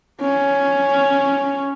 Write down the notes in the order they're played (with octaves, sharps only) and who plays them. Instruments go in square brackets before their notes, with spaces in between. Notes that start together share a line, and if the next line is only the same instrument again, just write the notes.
[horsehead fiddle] C#4